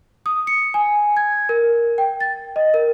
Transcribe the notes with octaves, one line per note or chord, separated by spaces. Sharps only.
D#6
C#7
G#5
G#6
A#4
G5
A6
D#5
A#4